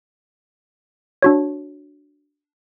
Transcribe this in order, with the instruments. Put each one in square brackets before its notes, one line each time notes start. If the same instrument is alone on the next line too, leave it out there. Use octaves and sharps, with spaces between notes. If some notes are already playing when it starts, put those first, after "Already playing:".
[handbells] D4 F#4 C#5